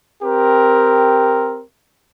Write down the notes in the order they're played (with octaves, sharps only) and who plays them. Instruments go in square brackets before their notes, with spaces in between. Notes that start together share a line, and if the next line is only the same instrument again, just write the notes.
[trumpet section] C4 G4 A#4